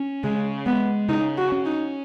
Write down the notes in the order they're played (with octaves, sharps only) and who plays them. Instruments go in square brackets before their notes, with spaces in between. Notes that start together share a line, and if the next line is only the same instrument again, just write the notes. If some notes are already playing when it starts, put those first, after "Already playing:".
Already playing: [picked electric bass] C#4
[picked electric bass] C#3 [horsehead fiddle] G#3
[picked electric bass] G#3 [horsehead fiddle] B3
[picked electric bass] C#3 [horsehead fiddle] D#4
[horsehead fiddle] F#4
[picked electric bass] C#4
[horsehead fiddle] D#4